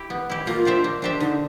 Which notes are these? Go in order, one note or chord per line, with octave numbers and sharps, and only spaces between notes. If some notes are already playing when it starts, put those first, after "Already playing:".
Already playing: E4 G4
B3
E4 G4
A#3 F4
D4 G4 C5 E5
A#3
D4 G4 C5 E5
D3 D#4